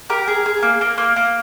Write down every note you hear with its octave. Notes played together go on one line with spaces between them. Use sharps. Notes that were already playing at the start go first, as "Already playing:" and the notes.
G4 A#4
G#4
G#4
A#3
A#3
A#3
A#3